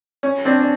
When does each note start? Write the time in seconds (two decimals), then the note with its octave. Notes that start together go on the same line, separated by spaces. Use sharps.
0.23 C#4
0.45 C4 D4
0.60 D4